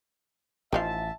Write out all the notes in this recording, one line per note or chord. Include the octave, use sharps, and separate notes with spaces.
A1 D#3 F3 E5 F5 A5